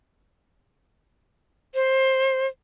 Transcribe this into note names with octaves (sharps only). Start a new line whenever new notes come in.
C5